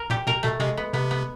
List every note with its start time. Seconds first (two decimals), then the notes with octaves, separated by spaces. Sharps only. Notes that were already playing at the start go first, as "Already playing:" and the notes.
Already playing: A#4
0.10 A#2 G4
0.27 B2 A#4
0.43 B2 A3
0.60 C3 G#3
0.77 B3
0.93 C3 B3
1.11 B3